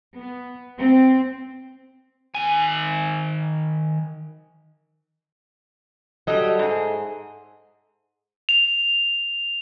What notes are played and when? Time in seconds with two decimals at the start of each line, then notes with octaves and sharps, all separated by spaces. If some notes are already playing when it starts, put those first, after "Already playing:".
0.16 B3
0.78 C4
2.35 D#3 G#5
6.27 F#3 G3 A4 D#5 E5
6.59 G#2 G#4
8.49 F7